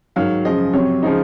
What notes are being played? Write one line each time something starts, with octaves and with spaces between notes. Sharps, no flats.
G#2 D#3 F#3 F5
F#2 C#3 F3 G#3 D#5
F2 C3 F#3 C#5
C#3 F3 G#3 D#4